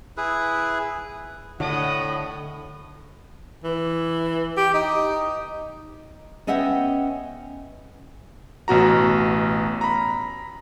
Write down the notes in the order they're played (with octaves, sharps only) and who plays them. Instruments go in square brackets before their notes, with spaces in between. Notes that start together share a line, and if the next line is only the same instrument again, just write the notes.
[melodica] E4 G#4 B4
[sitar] A2 [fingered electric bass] D3 [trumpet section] D#5 F#5 D#6
[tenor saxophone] E3
G4
D#4
[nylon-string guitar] B3 C#4 D#5 E5 F#5 G5
[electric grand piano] A1 B2 F#4 A#5
A#5 B5